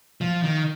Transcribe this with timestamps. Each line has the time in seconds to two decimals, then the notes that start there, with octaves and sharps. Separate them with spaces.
0.21 F3
0.43 D#3